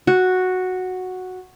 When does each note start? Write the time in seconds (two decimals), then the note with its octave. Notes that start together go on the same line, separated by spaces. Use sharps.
0.07 F#4